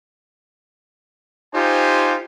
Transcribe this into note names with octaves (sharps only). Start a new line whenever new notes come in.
D#4 F4 G4 C5 G#5